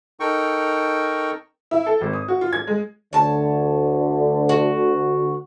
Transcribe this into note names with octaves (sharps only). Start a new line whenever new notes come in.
D#4 A4 A#4 G5 C#6
E4
A4
G#1
D#6
F#4
F4
G#6
G#3
D2 D3 C#5 A5
F#4